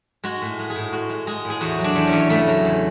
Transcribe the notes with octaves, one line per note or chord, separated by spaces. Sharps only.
G#3 F#4
A2
G#3
G#4
A2
G#3 F#4
G#3
G#3 G#4
A2
G#4
E2 F#4
F#3
D4
E2
C#4
E2
C#3 A3
F#3
E2